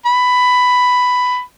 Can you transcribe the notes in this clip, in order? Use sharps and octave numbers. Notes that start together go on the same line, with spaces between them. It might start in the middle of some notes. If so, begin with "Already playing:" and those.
B5